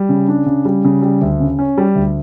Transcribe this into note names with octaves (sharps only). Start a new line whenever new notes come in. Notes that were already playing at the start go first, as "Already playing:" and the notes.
Already playing: G3
C#3
D4
C#3
G3
C#3
G3
D2
C#3
C#4
G3
D2